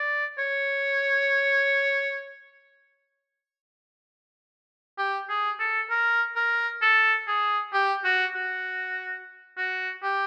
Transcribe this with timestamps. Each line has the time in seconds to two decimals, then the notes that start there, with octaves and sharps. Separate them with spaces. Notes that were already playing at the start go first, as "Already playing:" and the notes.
Already playing: D5
0.38 C#5
4.98 G4
5.29 G#4
5.59 A4
5.90 A#4
6.36 A#4
6.82 A4
7.28 G#4
7.73 G4
8.04 F#4
8.35 F#4
9.57 F#4
10.03 G4